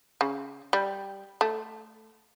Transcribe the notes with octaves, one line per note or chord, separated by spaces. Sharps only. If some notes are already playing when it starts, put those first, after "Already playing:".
C#3
G3
A3